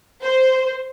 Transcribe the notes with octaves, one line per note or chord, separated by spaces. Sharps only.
C5